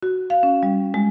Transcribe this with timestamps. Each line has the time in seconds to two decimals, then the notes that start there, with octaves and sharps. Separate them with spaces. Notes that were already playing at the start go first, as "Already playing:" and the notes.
0.03 F#4
0.30 F5
0.43 C#4
0.63 G3
0.94 G#3